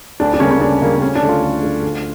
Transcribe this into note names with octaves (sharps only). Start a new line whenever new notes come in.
D2 D4
D4
C#3 G3 A#3 C#4
C#4
D2 D4
C#3 G3 A#3
A#3
D2 C#4
D4
D3 A3
F4
D2
D3 A3
D2